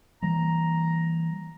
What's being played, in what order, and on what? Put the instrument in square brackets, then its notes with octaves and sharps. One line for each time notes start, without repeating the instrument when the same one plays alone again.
[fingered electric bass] E3 G3 A#3 [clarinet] A#5